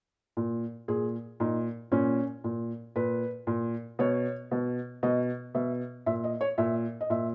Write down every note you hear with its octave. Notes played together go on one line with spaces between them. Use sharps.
A#2
A#2 G#4
A#2 D#4
A#2 C#4
A#2
A#2 B4
A#2
B2 C#5
B2
B2 D#5
B2 E5
A#2 E5
D#5
C#5
A#2 E5
D#5
A#2 E5